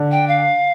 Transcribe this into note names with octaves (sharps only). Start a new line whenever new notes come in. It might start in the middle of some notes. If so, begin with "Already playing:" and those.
Already playing: D3
G5
F5